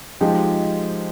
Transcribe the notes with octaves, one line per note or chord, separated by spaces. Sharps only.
F3 G#3 D#4 G4